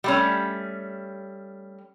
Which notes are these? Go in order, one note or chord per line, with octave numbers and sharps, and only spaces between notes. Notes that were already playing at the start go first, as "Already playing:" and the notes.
G3 A3 C#4